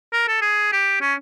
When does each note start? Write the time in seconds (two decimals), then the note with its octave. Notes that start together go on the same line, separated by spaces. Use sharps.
0.13 A#4
0.28 A4
0.42 G#4
0.72 G4
1.01 C#4